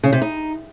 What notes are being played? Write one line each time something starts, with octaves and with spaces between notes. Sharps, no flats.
C#3
C3
D#4